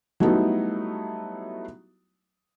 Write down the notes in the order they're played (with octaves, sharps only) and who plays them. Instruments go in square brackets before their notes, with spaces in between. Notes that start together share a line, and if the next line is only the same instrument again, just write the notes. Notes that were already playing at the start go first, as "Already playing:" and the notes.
[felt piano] F#3 G3 A3 B3 D#4 E4